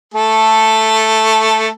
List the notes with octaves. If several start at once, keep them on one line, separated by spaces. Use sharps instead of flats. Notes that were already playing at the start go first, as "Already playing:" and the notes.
A3 A4